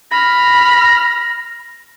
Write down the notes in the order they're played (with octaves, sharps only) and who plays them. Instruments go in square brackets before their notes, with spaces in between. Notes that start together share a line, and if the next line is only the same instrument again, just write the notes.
[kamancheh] B5 F6 [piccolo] A#6